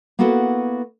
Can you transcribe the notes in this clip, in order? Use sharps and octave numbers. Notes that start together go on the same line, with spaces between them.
A#3 B3 E4 F#4 A4 B4